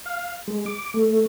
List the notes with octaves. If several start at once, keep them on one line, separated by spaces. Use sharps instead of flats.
F5
G#3
D6
A3